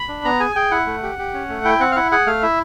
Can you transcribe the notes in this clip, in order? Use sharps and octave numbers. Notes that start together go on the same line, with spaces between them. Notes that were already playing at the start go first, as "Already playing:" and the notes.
Already playing: B5
D4
B3 A#5
G#4 G#5
G#4 G5
E4 F#5
A3
G4
G4
C#4
A3
E4 G5
C4 F#5
F5
E4 F#5
G#4 F#5
A3 F5
E4 E5